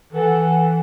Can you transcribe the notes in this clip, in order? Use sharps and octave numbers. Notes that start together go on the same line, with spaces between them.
E3 A4 F#5